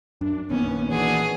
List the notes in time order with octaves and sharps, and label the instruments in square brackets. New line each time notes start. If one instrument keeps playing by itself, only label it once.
[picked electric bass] F#2 [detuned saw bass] D4
[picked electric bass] A#1 D#3 A#3 [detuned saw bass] B3 [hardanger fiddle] C#4
[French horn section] D3 B3 F#4 [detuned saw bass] E3 [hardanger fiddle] G#4